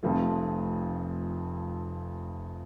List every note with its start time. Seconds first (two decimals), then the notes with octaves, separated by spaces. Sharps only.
0.03 F1 F2 F3 A3